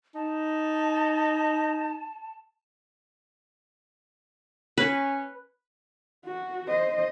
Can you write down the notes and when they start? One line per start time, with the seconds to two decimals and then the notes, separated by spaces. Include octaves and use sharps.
0.15 D#4 A5
4.78 C#4 B4
6.25 F#4
6.68 C5 D#5